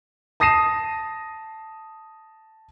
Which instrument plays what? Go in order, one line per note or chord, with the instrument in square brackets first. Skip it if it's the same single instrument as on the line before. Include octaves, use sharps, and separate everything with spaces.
[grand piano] A5 D#6 A#6 C7 D#7 E7